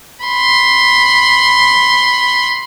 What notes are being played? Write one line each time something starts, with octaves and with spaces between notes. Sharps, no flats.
B5 C6